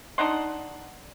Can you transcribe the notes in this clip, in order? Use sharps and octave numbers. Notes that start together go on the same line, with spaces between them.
D4 D#4 F#5 C6